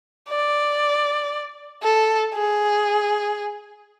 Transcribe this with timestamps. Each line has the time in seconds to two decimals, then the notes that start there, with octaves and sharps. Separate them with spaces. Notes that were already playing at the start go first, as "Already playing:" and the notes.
0.29 D5
1.83 A4
2.34 G#4